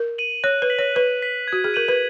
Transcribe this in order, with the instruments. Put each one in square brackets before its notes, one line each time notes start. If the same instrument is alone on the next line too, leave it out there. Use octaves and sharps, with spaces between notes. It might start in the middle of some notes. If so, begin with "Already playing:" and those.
Already playing: [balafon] A#4
[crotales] D#7 F#7
[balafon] C#5 [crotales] F#6
[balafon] B4
[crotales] B6 F#7
[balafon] C#5
[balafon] B4 [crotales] F#6
[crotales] B6 F#7
[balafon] F#4 [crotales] G#6
[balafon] G#4
[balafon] A#4 [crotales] D#7 F#7
[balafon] B4